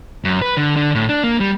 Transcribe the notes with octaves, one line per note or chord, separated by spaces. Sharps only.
F#2
B4
D3
D3
A2
D4
A#3
G3